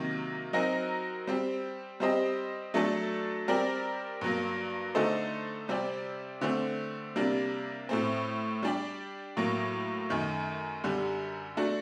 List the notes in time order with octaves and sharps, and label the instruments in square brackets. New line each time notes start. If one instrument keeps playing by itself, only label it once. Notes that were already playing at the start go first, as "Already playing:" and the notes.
Already playing: [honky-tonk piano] C3 D#3 F#3 A#3
F#3 C4 D#4 F#4 A#4
G3 C4 G4
G3 C4 G4 C5 D#5
F#3 A3 D4 A4
G3 C4 G4 A#4 D5
G2 F#3 A#3
D3 A3 D#4 A4 C5
C3 G3 C4 G4 D5
D3 A3 C4
C3 G3 A#3 D4
A2 A3 C4
G3 D4 G4 D5
A2 F#3 A#3
F#2 D#3 A3
F#2 D3 G3
A3 D4 F#4